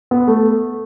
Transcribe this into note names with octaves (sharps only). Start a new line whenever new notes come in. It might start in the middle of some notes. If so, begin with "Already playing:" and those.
B3
A3